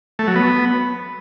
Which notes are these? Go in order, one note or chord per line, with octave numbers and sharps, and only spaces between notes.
A3
F#3
B3